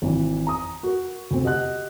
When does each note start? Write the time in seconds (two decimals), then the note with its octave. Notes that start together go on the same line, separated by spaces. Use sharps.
0.02 G#1 E3
0.47 A#5 D#6
0.83 F#4 A#4
1.31 D2 C4
1.44 G4 D#5 F#5 F#6